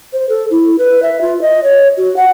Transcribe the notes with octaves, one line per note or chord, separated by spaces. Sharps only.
C5
A4
E4
B4
E5
F4
D#5
C#5
F#4
F#5